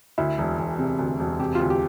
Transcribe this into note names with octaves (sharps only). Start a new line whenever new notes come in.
D2 E4
E1
E1
C3
D2
E1
C3 G4
D2 F4
G4